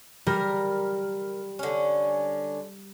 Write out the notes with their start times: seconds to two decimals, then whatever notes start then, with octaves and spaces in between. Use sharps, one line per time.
0.27 G3 A#4
1.59 D3 C#4